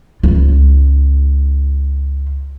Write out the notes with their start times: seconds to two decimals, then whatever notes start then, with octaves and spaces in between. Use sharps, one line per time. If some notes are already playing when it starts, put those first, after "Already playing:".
0.23 C#2 F4